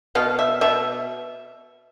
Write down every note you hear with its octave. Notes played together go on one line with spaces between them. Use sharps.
B2 F5
E5
B2 E5